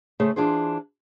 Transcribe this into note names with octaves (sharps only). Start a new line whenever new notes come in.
C#3 A3 G#4 A4 C5
E3 D4 F4 G#4 C5